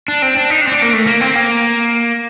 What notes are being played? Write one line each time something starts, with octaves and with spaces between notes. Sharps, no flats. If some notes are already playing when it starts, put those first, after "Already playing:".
D4
C4
D4
D#4
D4
C4
D4
A#3
A3
A#3
C4
A#3